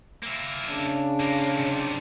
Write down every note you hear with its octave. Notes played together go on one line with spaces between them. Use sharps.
A#3 E4
C#3 D4
D3 A#3
D#2 C3